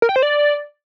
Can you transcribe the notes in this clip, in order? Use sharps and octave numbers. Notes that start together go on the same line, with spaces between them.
A#4
G5
C5
D5